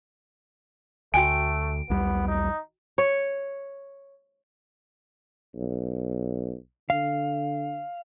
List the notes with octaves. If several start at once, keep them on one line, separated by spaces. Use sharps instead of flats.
D2 A3 F#4 G5 G#5 D7
B1 E2 G3 B3
D#4
C#5
B1
D3 F5